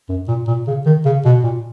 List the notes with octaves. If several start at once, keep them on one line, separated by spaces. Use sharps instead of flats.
F#2
A#2
A#2
C#3
D#3
C#3
B2
A#2